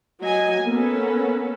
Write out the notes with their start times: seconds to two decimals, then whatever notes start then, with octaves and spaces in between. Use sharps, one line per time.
0.22 F#3 D#5 G#5
0.64 A#3 B3 C#4 A4 B4